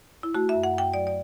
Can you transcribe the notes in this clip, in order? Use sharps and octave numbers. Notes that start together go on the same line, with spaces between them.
E4
A3 F#4
E5
F#2
F#5
F#2 G5
F#3 D5
D5